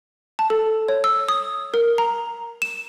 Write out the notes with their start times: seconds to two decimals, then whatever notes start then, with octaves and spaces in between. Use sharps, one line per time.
0.39 A5
0.50 A4
0.89 C#5
1.04 E6
1.29 D#6
1.74 A#4
1.98 A#5
2.62 E7